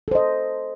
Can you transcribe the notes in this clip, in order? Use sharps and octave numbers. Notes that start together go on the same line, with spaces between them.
A4 C5 D#5